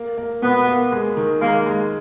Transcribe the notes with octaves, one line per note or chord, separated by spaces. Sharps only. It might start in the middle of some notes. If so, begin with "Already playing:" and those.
Already playing: A#3
A#3
B2 B3
A#3
G#3
D#3
G#3 A#3
G#3